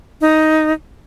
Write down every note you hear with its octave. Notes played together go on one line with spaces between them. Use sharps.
D#4